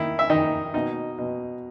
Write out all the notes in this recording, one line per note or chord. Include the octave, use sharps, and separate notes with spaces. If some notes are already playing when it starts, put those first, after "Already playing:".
Already playing: D#3 E4
E5
D#3 D#4 D#5
B2 D#4 D#5
B2